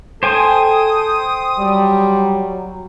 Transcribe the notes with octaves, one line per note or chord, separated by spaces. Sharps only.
A4 C5 G5 G#5 D#6
F#3 G3